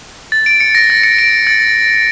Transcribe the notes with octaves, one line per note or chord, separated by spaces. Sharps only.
A6
D7
C#7
A#6
A6
C#7
D7
A6